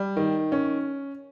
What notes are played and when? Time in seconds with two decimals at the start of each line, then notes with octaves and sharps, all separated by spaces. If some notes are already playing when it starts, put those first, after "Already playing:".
Already playing: G3
0.17 D#3
0.52 C#4